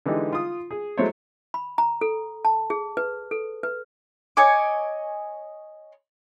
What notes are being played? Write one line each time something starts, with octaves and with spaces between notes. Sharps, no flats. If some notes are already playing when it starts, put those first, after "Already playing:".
D3 E3 G#3 D#4 G4
F4 D#6
G#4
F#3 G#3 A3 E4 C5 C#5
B5
A#5
A4
A5
G#4
B4
A4
B4
C#5 D#5 G#5 D6